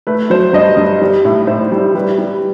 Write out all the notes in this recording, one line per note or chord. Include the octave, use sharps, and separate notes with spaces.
A3 B4
F#3 C5
G2 D#5
G2
G3
A2
A2 C5
G3
G3 B4
G3